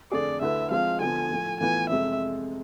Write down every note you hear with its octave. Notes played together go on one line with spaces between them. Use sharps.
F2 D3 A3 D4 G#4 D5
D2 D3 A3 E4 B4 E5
F3 G#3 C4 F5
D3 F3 B3 G#5
A2 F3 A3
A2 E3 B3 F4 B4 G#5
F2 C3 G#3 E5